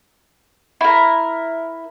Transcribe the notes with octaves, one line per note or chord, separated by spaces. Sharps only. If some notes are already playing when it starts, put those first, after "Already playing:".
E4 A#4